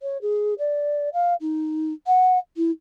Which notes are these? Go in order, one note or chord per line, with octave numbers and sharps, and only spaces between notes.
C#5
G#4
D5
F5
D#4
F#5
E4